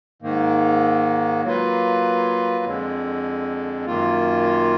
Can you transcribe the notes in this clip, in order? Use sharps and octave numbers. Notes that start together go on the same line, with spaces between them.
G#2 D#3 A#3
F#3 A#3 F4 B4
F2 D3 G#3
F#2 D#3 A#3 F4